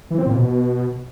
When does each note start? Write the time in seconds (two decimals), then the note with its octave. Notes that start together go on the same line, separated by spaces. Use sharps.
0.11 E3
0.19 C4
0.27 A#2
0.35 B2